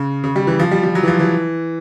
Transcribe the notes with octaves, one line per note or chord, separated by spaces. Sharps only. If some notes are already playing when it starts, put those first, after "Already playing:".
Already playing: C#3
C#3
G3
E3
F3
G3
G3
F#3
E3
F3
E3